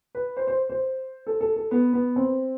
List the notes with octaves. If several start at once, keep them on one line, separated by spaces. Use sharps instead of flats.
B4
C5
C5
C5
A4
A4
A4
B3
B3
C4